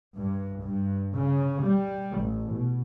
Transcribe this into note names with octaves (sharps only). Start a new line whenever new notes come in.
G2
G2
C#3
G3
A1
B2